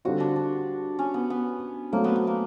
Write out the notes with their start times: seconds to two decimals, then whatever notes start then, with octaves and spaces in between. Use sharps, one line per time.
0.05 D3 G3 C4 F4 F#4
0.20 D4
0.36 D4
0.99 C#4
1.14 B3
1.30 B3
1.93 F#3 A3 A#3 C4
2.04 B3
2.16 B3
2.27 A#3